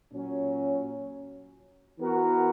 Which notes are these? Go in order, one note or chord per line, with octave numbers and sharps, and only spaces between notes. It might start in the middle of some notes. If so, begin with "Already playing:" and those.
A#2 F#3 C#4
E3 B3 F#4 A#4